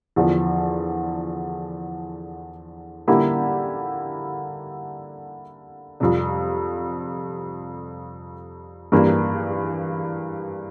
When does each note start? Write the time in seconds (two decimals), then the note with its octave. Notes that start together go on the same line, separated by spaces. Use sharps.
0.16 E2 D3 F3
3.08 D3 G3 A#3 E4 G4
6.00 F2 C3 G3
8.92 G2 E3 G3 A#3